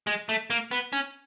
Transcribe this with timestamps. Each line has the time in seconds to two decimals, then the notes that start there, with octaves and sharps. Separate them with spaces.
0.07 G#3
0.29 A3
0.50 A#3
0.71 B3
0.93 C#4